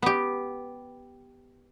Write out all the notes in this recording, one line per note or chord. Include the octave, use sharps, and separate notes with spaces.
B3 G4